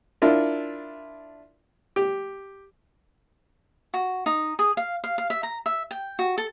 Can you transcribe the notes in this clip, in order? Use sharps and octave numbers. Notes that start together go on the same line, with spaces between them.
D4 E4 F4 A#4
G4
F#4
D#4
G#4
F5
F5
F5
E5
A#5
E5
G5
F#4
A4